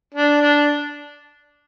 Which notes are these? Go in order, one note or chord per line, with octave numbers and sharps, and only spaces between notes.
D4
D4